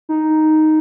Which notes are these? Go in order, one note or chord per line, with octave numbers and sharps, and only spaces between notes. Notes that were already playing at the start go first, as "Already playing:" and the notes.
D#4